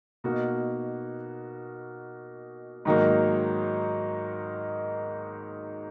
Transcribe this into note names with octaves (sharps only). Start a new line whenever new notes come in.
B2 A#3 D#4 F#4
G#2 D#3 F#3 A#3